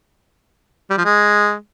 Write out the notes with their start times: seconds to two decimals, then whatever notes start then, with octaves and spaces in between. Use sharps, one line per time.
0.90 G3
0.98 F3
1.05 G#3